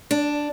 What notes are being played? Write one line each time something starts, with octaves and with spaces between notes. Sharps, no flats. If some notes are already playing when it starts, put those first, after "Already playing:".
D4